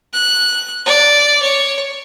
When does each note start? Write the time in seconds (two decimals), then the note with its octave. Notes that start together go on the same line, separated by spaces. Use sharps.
0.13 F#6
0.86 D5
1.42 C#5